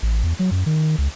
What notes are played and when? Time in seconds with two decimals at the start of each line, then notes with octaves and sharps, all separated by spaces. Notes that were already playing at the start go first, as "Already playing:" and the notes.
0.02 A1
0.24 E2
0.39 F#3
0.51 F#2
0.66 D#3
0.98 C#2